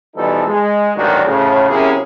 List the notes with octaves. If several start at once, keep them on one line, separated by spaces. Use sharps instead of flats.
B2 E3 F3 G3 D#4 A4
G#3
A1 G2 A#2 D#3 D4 F#4
A2 C#3 F3
C3 F#3 A#3 C#4 E4 G#4